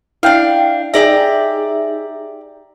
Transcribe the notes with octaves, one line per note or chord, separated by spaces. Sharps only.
D4 E4 F5 G5
D#4 G4 G#4 D5 E5 A#5